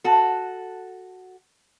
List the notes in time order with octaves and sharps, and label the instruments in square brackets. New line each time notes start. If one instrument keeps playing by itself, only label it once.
[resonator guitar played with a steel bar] F#4 A4